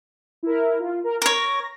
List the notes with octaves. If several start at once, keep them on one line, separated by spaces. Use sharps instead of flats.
E4 A#4
F4
A#4
A#4 C#5 A#6